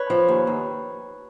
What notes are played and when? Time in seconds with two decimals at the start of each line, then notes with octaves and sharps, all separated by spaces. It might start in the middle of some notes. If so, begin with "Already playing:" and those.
Already playing: B4 C#5
0.10 F3
0.28 D#2
0.47 D#2